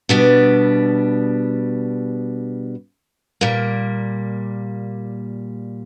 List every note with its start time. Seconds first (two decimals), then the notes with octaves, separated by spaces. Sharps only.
0.09 B2 G3 B3 D4
3.41 A#2 G3 A#3